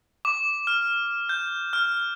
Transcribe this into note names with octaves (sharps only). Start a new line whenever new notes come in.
D6
F6
G6
F6